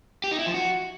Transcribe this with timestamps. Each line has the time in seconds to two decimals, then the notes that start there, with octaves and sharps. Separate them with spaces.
0.24 G4
0.31 D#4
0.39 E4
0.46 F3
0.54 F#4